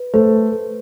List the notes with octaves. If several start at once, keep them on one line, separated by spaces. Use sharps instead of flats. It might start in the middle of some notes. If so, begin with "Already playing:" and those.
Already playing: B4
A3 C5